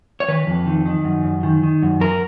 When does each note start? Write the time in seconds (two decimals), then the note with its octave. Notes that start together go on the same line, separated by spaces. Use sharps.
0.20 C#5
0.28 D#3 B4
0.47 F2
0.66 D#3
0.86 D#3
1.04 F#2
1.24 F#2
1.43 D#3
1.63 D#3
1.82 F#2
2.00 F#2 A#4